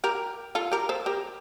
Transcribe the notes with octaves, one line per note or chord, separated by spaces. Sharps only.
G4 A#4
F4 A4
G4 A#4
A4 C5
G4 A#4